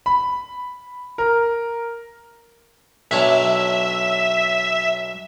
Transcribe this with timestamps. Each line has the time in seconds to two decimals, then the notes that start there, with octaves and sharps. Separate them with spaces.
0.06 B5
1.18 A#4
3.11 B1 D4 C#5 E5